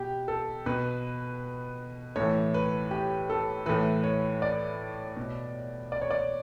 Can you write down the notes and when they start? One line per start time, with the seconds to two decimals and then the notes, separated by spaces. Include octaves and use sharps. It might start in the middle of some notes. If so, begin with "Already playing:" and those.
Already playing: B2 G4
0.28 A4
0.66 B2 B4
2.16 A2 E3 C#5
2.54 B4
2.91 G4
3.30 A4
3.66 A2 E3 B4
4.04 C#5
4.42 D5
5.16 B2
5.92 D5
6.02 C#5
6.11 D5